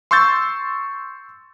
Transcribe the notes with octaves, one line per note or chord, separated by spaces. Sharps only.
C6 C#6 E6 G6 A6